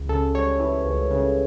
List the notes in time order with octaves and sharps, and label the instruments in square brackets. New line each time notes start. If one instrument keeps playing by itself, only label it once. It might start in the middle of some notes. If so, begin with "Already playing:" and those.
Already playing: [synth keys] C#2
C#3 A4
G3 C#5
E3
C#2
C#3